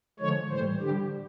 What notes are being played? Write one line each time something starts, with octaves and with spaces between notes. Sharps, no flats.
D3 F3 G#3 C#5
A2 E3 G3 C5
D3 G3 G4